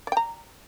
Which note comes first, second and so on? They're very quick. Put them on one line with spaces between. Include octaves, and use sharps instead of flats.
D5 G5 A#5